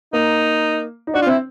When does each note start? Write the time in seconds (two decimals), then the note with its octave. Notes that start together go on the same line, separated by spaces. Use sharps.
0.13 A#3 D#4
1.07 D#4
1.14 D4 F#4
1.22 F4
1.26 C4 E4